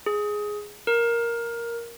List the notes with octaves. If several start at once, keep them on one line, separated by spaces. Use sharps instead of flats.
G#4
A#4